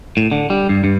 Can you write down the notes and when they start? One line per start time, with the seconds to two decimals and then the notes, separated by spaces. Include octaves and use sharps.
0.17 A2
0.32 D3
0.50 G3
0.69 G2
0.84 G2